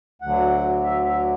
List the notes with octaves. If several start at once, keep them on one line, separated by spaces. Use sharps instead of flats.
D2 D3 F#3 F#5
E5
E5